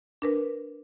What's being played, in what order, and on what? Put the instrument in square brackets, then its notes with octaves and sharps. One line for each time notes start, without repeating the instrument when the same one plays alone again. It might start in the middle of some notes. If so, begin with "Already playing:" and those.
[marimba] D4 A#4 B4